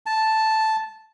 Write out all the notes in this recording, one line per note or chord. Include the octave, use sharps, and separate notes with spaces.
A5